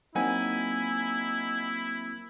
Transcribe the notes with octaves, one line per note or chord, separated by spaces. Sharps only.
F#3 A#3 C4 D#4 E4 F#5 G#5